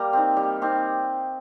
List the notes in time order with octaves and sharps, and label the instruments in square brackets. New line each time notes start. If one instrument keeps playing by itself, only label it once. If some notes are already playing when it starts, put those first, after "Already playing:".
Already playing: [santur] G3 A#3 A#5
C4 D#4
G3
C4 D#4